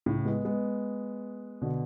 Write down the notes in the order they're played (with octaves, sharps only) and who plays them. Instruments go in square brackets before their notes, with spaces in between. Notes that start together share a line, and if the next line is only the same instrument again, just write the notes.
[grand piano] A2 C#3
G#3 B3
G#3 B3
B2 D3